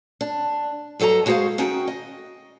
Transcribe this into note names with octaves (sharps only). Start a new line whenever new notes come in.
D4
G2 F#3 A4 D#5 A#5
G#3 F#4 G#4 B4 C5 F5
D#3 C#4 D#4 F#4 G5
D#5